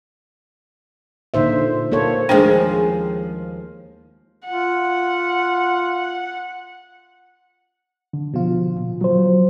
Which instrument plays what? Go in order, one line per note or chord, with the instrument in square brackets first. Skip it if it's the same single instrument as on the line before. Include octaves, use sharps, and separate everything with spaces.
[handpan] A#2 D3 D#4 C5 E5
A#3 A4 C5 C#5
[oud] D#2 F3 G#3 [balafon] D4 C5 G5
[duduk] F4 [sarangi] F#5
[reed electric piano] D3
[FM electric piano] B2 F3 F4
[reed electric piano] A#2
F#3 C5